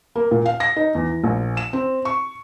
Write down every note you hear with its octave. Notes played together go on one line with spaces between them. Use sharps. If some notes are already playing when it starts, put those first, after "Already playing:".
A#3
A#2
F5
A#6
D#4
E2
E3
A#1
E7
C4
C#6